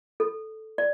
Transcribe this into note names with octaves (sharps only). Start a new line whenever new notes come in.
A4
D5